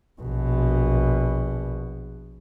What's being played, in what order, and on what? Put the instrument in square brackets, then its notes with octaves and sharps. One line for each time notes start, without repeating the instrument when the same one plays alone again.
[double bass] A#1 B2